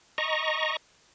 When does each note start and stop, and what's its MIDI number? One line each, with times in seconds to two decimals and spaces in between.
0.18 0.77 75
0.18 0.77 82
0.18 0.77 85